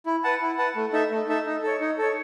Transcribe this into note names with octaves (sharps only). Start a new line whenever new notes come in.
E4
B4 F#5 A5
E4
B4 F#5 A5
A3
D#4 A4 E5
A3
D#4 A4 E5
D#4
A4 C#5
D#4
A4 C#5